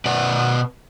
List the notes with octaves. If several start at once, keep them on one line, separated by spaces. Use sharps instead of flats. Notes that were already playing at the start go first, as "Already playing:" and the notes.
B2 B4 D5 F#5